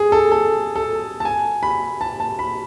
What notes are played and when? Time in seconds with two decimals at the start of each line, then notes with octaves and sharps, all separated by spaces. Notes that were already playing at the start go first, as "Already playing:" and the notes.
Already playing: G#4
0.12 A4
0.32 A4
0.76 A4
1.20 A5
1.25 G#5
1.63 B5
2.01 A5
2.20 A5
2.39 B5